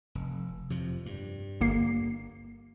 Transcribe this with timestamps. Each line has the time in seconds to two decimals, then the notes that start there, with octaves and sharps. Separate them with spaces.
0.15 F1
0.70 F2 C3 F3
1.06 G2
1.61 G1 A#3 C7